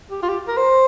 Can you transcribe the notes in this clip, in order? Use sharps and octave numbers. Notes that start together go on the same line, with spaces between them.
G4
F4
G4
A#4
C5